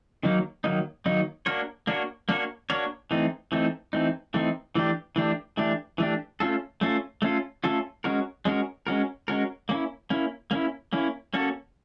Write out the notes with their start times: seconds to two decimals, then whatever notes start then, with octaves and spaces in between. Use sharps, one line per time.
0.23 D#3 F#3 A#3 D#4
0.64 D#3 F#3 A#3 D#4
1.06 D#3 F#3 A#3 D#4
1.46 A#3 D4 F#4 A#4 C#5
1.87 A#3 D4 F#4 A#4 C#5
2.29 A#3 D4 F#4 A#4 C#5
2.70 A#3 D4 F#4 A#4 C#5
3.11 E3 A3 C4 D#4
3.52 E3 A3 C4 D#4
3.93 E3 A3 C4 D#4
4.34 E3 A3 C4 D#4
4.75 E3 A3 D4 G4
5.16 E3 A3 D4 G4
5.57 E3 A3 D4 G4
5.98 E3 A3 D4 G4
6.40 A3 C#4 F4 A4
6.81 A3 C#4 F4 A4
7.22 A3 C#4 F4 A4
7.64 A3 C#4 F4 A4
8.04 G#3 C#4 F#4 A#4
8.45 G#3 C#4 F#4 A#4
8.87 G#3 C#4 F#4 A#4
9.28 G#3 C#4 F#4 A#4
9.69 A#3 C#4 E4
10.10 A#3 C#4 E4
10.51 A#3 C#4 E4
10.93 A#3 C#4 E4
11.34 A#3 C#4 F#4 A4